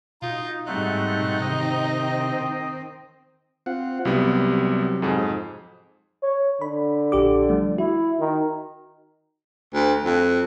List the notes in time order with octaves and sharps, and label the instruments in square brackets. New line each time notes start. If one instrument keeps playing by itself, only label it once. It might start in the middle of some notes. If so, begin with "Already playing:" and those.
[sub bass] B2 [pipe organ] D#4 [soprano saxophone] F4
[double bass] G#2 G3 [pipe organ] A3 C4 F#5 [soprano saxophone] D#4
[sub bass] C3 [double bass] D#3 C4 [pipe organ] D#5
[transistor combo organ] C4 F4 F#5
[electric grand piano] C2 G3 B3 [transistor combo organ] C3 F#3
[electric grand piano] F2 G#2 G#4
[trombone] C#5
[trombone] D3 [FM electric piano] B5
[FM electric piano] A#1 G4 D6
F3 G3 A3
[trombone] E4 [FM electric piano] F#4
[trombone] D#3
[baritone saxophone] D2
F2